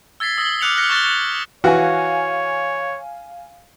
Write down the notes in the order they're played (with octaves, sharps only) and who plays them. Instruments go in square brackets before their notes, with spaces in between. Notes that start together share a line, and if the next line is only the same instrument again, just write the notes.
[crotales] E6 G#6 A6 B6 C7
D#6 E6 G#6 A#6 F#7 G7
D6 F6 F#6 C#7 F7
F6 F#6 A#6 C#7 G7
C#6 F#6 A6 G7
C#6 F#6 C#7
[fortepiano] E3 F#4 [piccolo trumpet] C#5 [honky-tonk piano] F5 G#5